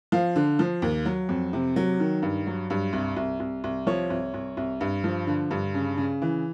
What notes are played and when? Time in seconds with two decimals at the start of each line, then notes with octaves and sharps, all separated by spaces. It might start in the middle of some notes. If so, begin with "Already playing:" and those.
0.12 F3 F5
0.36 D3
0.59 F3
0.82 D#2
1.05 F#3
1.29 F2
1.53 C3
1.76 F#3
2.00 D#3
2.22 G2
2.47 F#3
2.70 G2
2.93 C2
3.17 C2
3.40 C2
3.64 C2
3.87 F3 C#5
4.10 C2
4.34 C2
4.57 C2
4.81 G2
5.04 F3
5.27 D3
5.51 G2
5.74 C#3
5.97 C#3
6.22 E3